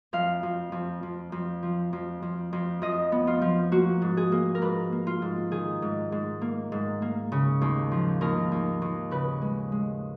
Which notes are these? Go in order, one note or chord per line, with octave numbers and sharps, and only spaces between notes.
F2 F5
F2
F2
F2
F2
F3
F2
F2
F2
F2 D#5
B3
F4
F3
A#3 F#4
G#2
G#4
A#3
A#4
G#2 B4
A#3
F4
G#2
D#3 G#4
G#2
G#2
A#3
G#2
A#3
C#3
D#2
F3
D#2 A#4
D#2
D#2
C#3 B4
G#3
G#3